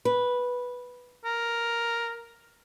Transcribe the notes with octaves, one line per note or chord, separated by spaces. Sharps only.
B4
A#4